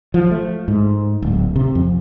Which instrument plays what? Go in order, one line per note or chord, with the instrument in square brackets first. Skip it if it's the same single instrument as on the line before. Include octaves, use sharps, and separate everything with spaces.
[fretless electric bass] F3
A3
G#2
D1
C3
F2